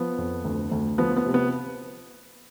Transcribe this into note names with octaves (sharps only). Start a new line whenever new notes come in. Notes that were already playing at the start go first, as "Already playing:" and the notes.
Already playing: F3 B3
F2
D2
D2
F3 B3
B3
C3
B3